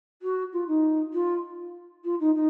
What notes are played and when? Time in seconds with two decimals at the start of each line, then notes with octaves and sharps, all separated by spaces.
0.22 F#4
0.53 F4
0.68 D#4
1.13 F4
2.04 F4
2.20 D#4
2.35 D#4